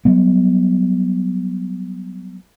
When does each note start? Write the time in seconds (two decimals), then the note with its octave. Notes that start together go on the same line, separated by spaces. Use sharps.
0.05 F#3 G3 B3